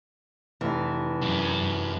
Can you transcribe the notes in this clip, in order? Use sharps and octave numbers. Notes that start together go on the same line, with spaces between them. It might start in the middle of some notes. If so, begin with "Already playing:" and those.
F1 E3
F#2